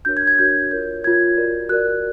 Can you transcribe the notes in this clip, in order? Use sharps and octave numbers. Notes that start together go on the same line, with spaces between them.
D4 F#4 A#4 C#5 G6
G#6
G#6
D4 F#4 A#4 C#5 G6
F4 A#4 C#5 G6
F4 A#4 C#5 G#6
F#4 A#4 D5
F#4 A#4 D5 F#6